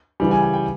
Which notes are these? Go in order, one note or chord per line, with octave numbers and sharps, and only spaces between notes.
C#3 E3 G3
G#5
G5
G5